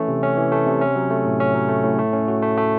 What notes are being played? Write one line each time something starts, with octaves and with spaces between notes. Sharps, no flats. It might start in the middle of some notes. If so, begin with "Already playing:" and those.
Already playing: E3 A3 C#4
C3
C#4
E3
A3
C3
C#4
F#3
A3
A2
C#4
F#3
A3
A2
A3
C#4
F#4
A3
A3